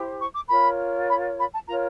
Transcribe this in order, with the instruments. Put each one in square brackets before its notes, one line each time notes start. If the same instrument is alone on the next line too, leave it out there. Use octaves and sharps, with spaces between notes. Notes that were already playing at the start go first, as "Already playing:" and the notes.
Already playing: [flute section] E4 G4 C5
C#6
D6
F4 A#4 C#5 B5
B5
B5
A5
F4 A#4 C#5 A#5